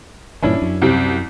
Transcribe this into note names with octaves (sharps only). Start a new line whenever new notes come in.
G2 A#2 E3 C#4 D4 E4
F#2
C2 C4 G4